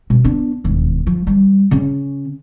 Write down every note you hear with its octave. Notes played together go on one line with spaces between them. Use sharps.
B2
B3 D4
E1 D#2
F3
E3 G3
C#3 C#4